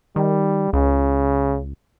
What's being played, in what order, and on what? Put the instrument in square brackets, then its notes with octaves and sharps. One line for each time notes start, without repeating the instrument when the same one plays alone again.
[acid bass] D#3 [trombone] G3
[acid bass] C#2 [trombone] C#3